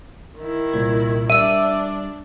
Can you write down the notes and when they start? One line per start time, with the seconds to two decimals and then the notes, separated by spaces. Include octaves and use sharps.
0.38 D#3 E4
0.73 C2 A#2 G#6
1.30 G3 D4 E5 E6 D#7